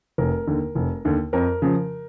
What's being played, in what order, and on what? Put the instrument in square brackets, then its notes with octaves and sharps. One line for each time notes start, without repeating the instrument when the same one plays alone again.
[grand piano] F1 A#4
D#2 D3
F1
D#2 D3
F2 A#4
C#3 F3